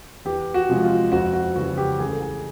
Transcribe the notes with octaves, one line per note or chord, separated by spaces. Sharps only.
E2 G4
F#4
C3 F3 G#3
F4
F2 F#4
F#4
C#3 E3 G3 F#4
G4
A1 G#4
A4
G#4